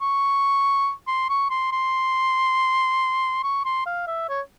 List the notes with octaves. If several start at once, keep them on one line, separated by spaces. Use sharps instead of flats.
C#6
C6
C#6
C6
C6
C#6
C6
F5
E5
C#5